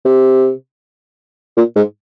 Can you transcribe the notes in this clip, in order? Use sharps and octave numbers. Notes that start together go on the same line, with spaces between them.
C3
A#2
G#2